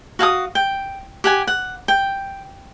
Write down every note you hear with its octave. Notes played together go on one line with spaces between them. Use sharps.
F#4 F5 G#5 D#6
G5
G4 F#5 G#5
F#5
G5